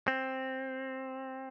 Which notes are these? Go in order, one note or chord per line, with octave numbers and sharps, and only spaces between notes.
C4